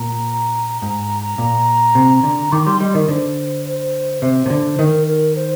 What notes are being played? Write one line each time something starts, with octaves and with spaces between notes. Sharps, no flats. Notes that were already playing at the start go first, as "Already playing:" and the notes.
Already playing: A#2 A#5
G#2 A#5
A#2
C3
D3
D#3 D6
G3 C6
G3 D#5
D#3 A#4
D3 C5
C5
C3 C5
C3
D3
D#3 A#4
A#4
C5